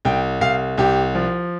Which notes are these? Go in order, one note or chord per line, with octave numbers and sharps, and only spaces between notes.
C2 G5
C2 F5
C2 G4
F3